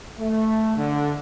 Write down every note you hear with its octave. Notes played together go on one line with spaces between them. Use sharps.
A3
D3